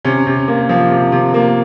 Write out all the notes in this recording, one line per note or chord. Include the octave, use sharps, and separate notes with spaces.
C3 C#4
C3
A#3
F3
C3
C3
A#3